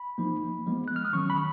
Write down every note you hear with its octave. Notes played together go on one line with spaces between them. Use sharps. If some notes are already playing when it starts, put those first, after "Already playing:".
Already playing: B5
F3 A#3 D#4
F3 G#3 B3
F#6
F6
D#6
D#3 F#3 C#4 C#6
B5